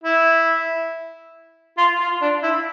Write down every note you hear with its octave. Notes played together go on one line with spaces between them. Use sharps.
E4
F4
F4
D4
E4